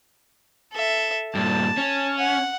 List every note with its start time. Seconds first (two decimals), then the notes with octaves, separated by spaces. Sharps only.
0.73 A4 E5
1.35 G2 A#2 A5
1.77 C#4
2.18 F#5